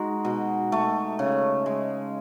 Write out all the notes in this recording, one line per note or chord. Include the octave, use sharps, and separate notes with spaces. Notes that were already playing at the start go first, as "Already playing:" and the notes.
Already playing: G#3 D#4 F#4
B2
A3
C#3
G#3